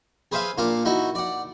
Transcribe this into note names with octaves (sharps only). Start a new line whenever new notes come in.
G#4 B4 C5 E5 F5 G#5
A#2 A#3 D4 F5
D#4 E4 F#4
D5 F#5